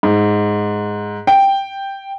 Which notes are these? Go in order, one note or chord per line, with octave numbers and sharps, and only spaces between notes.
G#2
G5